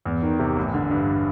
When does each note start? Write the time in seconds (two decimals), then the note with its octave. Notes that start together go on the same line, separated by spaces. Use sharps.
0.05 E2
0.23 D#3
0.39 C3
0.56 A1
0.74 D3
0.91 G2